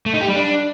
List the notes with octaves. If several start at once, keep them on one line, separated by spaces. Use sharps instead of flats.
A3
D#4
G4
G3
D4